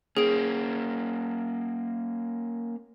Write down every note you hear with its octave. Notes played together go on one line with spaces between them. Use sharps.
A#3 C#4 G#4 D7